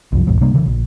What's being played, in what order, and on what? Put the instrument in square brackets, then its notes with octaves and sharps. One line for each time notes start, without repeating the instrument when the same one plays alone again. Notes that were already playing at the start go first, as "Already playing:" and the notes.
[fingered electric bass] C2 F#2 F3
B1 F2 G#2
C3 G3 A#3 D4
C#3 E3
A#1